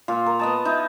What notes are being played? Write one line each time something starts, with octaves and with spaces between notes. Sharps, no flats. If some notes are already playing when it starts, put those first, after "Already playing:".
A#2 F4
A#4
B3 D#5 A5
D#4 E4